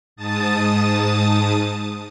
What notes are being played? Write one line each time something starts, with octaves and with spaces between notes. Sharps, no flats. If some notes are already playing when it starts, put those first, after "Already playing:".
G#2 A5 D#6 A6